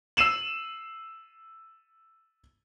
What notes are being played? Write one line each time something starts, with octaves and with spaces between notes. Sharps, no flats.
E6 C7 D#7 E7 F#7